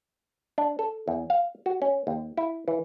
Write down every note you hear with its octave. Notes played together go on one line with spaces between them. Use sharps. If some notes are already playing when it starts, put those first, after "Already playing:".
D4
A4
E2
F5
F#4
C#4
D#2
E4
E3